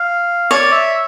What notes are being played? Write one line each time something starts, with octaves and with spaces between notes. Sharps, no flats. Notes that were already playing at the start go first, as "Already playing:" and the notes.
Already playing: F5
C#5 D5
E5